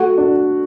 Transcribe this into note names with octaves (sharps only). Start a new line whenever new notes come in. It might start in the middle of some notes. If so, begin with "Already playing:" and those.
Already playing: A3 F#4
D4